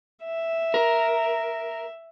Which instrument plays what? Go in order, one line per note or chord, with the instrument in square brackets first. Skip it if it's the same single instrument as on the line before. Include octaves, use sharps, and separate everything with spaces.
[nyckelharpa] E5
[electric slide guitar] A#4